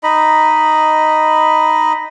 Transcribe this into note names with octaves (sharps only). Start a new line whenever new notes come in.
D#4 D#5 B5